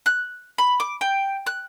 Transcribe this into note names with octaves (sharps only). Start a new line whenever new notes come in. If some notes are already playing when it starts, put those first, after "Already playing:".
F#6
B5
D6
G5
F#6